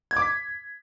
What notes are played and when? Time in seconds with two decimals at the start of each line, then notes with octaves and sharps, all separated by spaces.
0.11 G#6
0.17 D6
0.22 B6